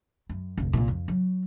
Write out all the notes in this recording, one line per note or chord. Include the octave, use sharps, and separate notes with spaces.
F#2
F1 A#1
C2 A#2
F2
F#3